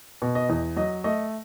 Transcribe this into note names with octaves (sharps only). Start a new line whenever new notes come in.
B2
D#5
E2
F#3 D#5
A3 D#5